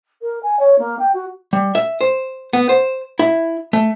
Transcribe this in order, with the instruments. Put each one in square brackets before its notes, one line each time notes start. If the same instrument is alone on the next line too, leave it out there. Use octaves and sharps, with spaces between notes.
[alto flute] A#4
G#5
C#5
A#3
G5
F#4
[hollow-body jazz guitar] G3
E5
C5
B3
C5
E4
A3